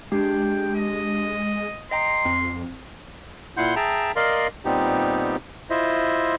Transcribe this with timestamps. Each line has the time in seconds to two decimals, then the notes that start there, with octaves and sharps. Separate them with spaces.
0.12 G#3 D4 G4 G5
0.75 D#5
1.91 D#5 G5 A#5 C6
2.25 F2 C4
3.57 A#2 E4 F#5 C6 G6
3.76 G#4 E5 G5 A5 A#5
4.16 A#4 D5 D#5 F5 C6
4.65 A#2 G3 B3 C4 D#4 G4
5.70 E4 F4 C5 D#5 E5